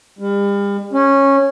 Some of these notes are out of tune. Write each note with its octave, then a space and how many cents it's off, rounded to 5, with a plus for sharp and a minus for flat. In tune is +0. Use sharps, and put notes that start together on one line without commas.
G3 +40
C#4 -10